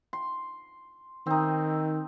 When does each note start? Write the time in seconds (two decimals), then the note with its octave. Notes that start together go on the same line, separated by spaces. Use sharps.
0.13 C6
1.26 D#3 C4 D#4